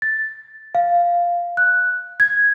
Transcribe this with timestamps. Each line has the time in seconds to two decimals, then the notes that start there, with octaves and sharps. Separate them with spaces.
0.02 A6
0.75 F5
1.57 F#6
2.20 G#6